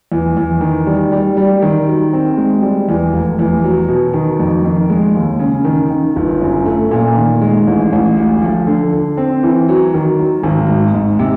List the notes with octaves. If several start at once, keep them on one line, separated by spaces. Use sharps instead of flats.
E2
E2
D#3
G3
G3
G3
D#3
F#3
C4
G#3
G3
E2
F1
E2
F#3
B2
D#3
F2
D#3
G#3
D#2
C#3
D#3
D#3
G1
F#2
A3
A#2
D#3
G#3
A1
A1
D2
F3
D3
D3
C4
E3
F#3
D#3
F#3
G#1
G#2
G#2
C3